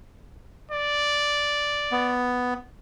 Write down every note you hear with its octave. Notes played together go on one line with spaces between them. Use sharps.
D5
B3